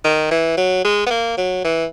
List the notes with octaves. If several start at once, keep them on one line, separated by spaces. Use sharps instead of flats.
D#3
E3
F#3
G#3
B3
A#3
F#3
E3